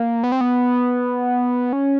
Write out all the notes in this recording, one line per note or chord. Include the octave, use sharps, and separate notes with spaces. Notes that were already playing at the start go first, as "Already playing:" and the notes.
Already playing: A#3
B3
C4
B3
C#4